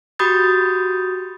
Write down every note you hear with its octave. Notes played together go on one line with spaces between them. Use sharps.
F#4 G4 B5 D#6 G6 A6